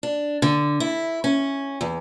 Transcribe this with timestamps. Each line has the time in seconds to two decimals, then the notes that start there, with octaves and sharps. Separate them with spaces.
0.03 D4
0.42 D3
0.80 E4
1.24 C#4
1.81 E2